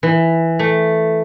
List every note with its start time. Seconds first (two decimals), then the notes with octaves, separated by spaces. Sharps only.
0.03 E3
0.59 A3